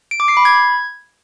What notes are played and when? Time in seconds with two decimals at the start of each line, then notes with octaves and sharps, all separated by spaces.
0.11 D7
0.20 D6
0.28 C7
0.37 B5
0.45 G#6